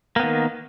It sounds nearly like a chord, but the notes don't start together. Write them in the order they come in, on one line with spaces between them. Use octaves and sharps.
A#3 B3 D#3